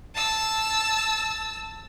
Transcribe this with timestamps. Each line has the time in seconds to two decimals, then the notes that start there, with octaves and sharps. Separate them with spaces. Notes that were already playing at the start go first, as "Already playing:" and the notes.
0.15 A5 E6